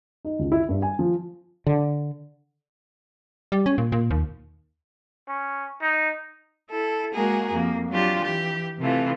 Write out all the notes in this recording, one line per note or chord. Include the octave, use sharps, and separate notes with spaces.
D#4
C#2
E4
G2
G#5
F3
D3
G3
C#4
A#2
A#2
D#2
C#4
D#4
E4 A4
G#3 A#3 F#4 G#4 A#4
F2 A#3
F#3 D4 F4 G4
E3 G4
C3 E3 A3 F4